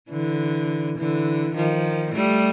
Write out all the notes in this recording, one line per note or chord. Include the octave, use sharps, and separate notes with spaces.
D3 E3
D3 E3
D#3 F3
G3 A3